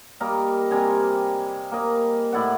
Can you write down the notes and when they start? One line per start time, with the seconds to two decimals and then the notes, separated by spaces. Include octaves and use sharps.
0.20 G3 A#3 A#4 D#5
0.70 C3 G3 G#5 A#5
1.72 A#3 D#5
2.32 A2 E4 D5 F#5